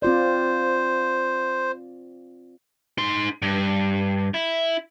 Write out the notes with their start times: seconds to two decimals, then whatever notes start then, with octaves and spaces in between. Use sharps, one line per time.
0.02 C4 F4 C5 D5
2.98 D#4 C6
3.42 G2
4.34 E4